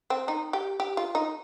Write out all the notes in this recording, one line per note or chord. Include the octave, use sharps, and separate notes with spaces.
C4
D#4
G4
G4
F4
D#4